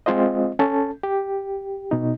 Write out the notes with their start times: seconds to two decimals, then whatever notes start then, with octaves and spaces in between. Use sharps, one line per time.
0.06 G#3 C4 F4 C5 D#5
0.59 C#4 A4 A5
1.03 G4
1.91 B2 D#4